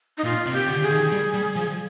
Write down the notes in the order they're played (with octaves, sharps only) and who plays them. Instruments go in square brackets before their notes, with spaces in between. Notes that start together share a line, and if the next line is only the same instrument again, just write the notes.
[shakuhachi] D#4
[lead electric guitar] A#2 [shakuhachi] F4
[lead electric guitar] C3
[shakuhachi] G4
[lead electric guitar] D3
[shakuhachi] G#4
[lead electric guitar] D#3
G3
G3
F3